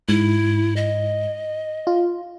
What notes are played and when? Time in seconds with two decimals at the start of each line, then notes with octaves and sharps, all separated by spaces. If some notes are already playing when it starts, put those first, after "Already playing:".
0.09 G#2 E4
0.76 D#5
1.87 F4